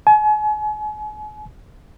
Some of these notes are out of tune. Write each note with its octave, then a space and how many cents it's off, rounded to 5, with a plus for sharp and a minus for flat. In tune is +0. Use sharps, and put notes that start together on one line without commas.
G#5 +40